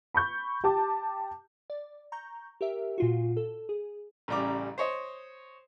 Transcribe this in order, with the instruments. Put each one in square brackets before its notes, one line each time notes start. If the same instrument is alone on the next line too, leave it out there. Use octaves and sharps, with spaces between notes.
[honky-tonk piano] B5 C#6 G6
G4 A5 D6
[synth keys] D5
A#5 C#6 G6
G4 A#4 E5
A#2 F4 F#4
A4
G#4
[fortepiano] A1 C#3 G3 A#5 D6
C5 C#5 D#5